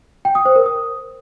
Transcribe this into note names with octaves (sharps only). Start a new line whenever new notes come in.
G5
D#6
C5
A#4
D#6